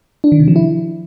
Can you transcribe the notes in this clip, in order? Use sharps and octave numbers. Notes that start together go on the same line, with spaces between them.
D4
D#3
C3
F3
E4